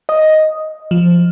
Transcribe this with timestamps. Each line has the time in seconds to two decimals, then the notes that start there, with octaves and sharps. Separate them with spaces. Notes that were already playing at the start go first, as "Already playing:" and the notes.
0.09 D#5
0.91 F3